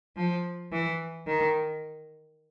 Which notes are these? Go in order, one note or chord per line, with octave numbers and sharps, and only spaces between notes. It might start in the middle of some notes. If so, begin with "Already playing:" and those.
F3
E3
D#3